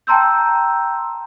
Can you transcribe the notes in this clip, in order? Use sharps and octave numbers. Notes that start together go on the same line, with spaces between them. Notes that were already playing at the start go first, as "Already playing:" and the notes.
G5 A5 A#5 C6 E6 G6